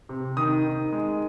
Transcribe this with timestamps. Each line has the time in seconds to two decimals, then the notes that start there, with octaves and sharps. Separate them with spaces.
0.09 C3
0.37 D#3 D#6
0.65 D#3
0.92 G#3